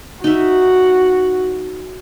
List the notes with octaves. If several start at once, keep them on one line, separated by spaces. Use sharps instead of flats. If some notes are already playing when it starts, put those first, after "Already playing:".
D#4 F#4 E5